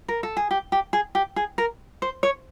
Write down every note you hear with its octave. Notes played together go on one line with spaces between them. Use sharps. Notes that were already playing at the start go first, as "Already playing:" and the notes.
A#4
A4
G#4
G4
G4
G#4
G4
G#4
A#4
C5
C#5